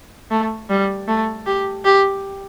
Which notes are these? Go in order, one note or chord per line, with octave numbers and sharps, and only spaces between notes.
A3
G3
A3
G4
G4